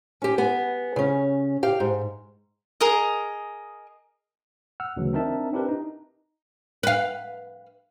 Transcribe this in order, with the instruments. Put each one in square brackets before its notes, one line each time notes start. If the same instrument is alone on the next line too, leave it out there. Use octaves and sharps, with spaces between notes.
[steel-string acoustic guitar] C#4 G4
B3 G#5
C#3 C#4
G4 F5
G#2
[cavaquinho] G#4 A#4 D#5
[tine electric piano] F#5 E6 F6
D2 C#3 E3 F#3
C4 D4 D#4 A#4 E5 A5
C4 D4 E4 G4 A#4 B4
D#4
[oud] B4 F5